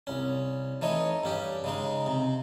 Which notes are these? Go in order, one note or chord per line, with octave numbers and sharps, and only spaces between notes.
C2 C#4
E3 A3 D#4 C#5 D#5
G2 C#4 G4
C#3 G#3 D#4
C3